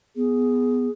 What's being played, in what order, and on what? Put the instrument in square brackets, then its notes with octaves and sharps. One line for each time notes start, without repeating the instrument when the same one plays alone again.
[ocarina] B3 [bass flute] G#4